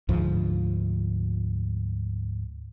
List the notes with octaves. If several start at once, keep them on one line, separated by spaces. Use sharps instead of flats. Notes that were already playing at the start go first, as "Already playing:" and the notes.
D2 G#2 F3